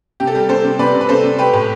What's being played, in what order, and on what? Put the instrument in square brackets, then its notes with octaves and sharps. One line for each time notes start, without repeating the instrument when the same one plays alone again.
[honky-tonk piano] C3 G4
A4
G3 G4
C3 A4 C5
C3
C3 B4 D5
C3
B4
C3 A4 C5
C3
A3 G4 B4
A2